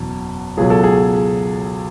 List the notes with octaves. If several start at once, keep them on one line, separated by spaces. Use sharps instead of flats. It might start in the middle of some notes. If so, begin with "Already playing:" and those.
Already playing: F#1 E2 B2
C#2 B2 F#3 G#4
A4
G#4